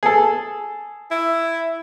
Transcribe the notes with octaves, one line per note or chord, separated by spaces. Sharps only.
G#4 A4
E4